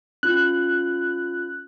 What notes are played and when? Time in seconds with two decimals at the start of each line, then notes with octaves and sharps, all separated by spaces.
0.23 C#4 F4 F#6